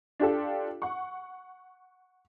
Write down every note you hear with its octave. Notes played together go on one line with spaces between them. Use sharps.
D4 F4 G4 A4
F#5 C#6